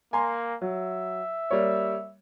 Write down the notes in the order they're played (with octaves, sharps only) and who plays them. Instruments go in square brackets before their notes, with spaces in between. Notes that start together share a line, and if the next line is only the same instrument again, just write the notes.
[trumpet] A#3 [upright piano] G#5 A#5 C6
[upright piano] F#3 [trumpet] E5
[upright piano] G3 A#3 C#5